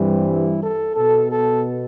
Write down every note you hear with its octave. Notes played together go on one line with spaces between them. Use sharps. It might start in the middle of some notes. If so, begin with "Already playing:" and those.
Already playing: G2 E3 G3 C4
E4
A4
B2 B3 A4
A4